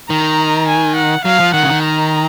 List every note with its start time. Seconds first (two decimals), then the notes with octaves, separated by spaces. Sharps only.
0.10 D#3 A#5
0.68 G#5
0.96 F#5
1.25 F#3 F5
1.40 F3
1.54 D#3 F#5
1.62 C#3
1.69 D#3
1.83 A#5